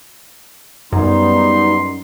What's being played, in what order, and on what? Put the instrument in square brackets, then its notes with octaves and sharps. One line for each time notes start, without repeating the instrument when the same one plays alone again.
[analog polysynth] F#2 [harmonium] G3 B3 D#4 [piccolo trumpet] C6